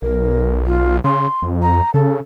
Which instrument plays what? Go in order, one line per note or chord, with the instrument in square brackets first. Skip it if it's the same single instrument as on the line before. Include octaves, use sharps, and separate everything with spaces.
[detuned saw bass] B1 [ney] A#4
[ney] F4
[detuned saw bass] C#3 [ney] C6
[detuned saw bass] F2
[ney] A#5
[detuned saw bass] C#3 [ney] A4